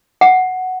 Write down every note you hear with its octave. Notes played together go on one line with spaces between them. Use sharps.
F#5